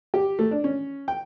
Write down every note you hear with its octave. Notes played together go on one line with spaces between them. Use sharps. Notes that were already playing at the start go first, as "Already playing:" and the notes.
G4
A3
D4
C#4
G5